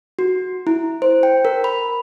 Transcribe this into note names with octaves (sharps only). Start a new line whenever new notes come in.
F#4
E4
C5
G5
A#4
B5